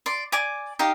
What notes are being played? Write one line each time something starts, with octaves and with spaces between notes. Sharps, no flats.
D5 C6
D5 G#5 D6
D#4 G4 F5